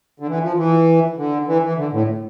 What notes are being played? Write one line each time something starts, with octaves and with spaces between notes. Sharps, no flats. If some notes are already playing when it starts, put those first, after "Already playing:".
D3
E3
F3
E3
D3
E3
E3
D3
A2